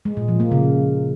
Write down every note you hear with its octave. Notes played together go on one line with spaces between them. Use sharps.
G#3
A#2
F3
A#3
C#3